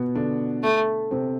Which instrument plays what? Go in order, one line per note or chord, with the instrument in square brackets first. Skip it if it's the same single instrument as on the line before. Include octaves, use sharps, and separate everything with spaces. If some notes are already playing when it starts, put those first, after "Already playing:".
Already playing: [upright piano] B2 B3
D3 D4
[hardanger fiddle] A3
[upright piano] C3 C4